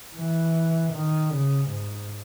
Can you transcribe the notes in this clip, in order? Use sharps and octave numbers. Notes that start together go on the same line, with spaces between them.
E3
D#3
C#3
G#2